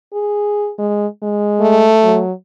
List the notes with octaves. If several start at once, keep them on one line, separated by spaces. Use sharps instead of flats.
G#4
G#3
G#3
A3
F#3